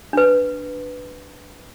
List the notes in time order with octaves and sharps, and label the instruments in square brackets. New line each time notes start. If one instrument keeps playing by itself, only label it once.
[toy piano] D4 B4